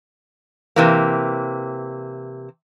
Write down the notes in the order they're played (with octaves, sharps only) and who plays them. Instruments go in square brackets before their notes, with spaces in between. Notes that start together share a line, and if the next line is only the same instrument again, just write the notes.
[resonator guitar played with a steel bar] C3 E3 A#3